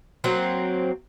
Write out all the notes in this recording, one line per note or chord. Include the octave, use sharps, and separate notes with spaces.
F#3 A#3 C4